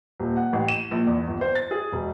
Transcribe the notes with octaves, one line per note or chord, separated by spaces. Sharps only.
D#1
F#5
A1
E7
A#1
E2
G1
C5
A6
G#4
E1